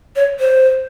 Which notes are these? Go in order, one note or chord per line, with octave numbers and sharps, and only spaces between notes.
C#5
C5